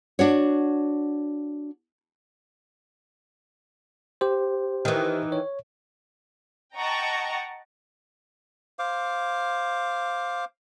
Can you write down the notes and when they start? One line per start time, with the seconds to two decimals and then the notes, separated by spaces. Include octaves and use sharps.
0.19 D4 F#4 C#5
4.21 G4 C5
4.85 D#3 E3
5.32 C#5
6.76 D#5 F#5 G5 A5 A#5 C#6
8.79 C5 F5 D6